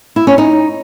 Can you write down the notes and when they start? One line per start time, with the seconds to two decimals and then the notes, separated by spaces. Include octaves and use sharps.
0.16 E4
0.27 C#4
0.38 D#4